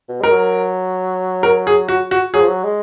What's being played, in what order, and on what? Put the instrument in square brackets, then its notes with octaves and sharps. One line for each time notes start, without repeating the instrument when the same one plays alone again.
[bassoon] B2
[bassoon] G#3 [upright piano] A#4
[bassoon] F#3
[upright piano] A#4
G#4
F#4
F#4
[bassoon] F#3 [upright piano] G#4
[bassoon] F3
F#3
G#3